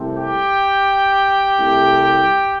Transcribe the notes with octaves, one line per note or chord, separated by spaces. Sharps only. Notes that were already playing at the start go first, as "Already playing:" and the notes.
Already playing: C2 C3 A3 C4
G4 G5
C2 C3 A3 C4